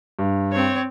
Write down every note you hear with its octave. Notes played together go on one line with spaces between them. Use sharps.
G2
C4 C#5